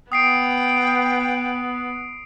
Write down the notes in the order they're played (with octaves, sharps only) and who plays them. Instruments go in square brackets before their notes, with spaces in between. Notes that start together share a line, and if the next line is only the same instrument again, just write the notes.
[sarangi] B3 [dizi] G5 [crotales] D#6 C7 D7